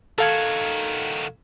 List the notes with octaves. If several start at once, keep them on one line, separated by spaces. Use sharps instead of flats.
D#3 F#4 A4 F5 G#6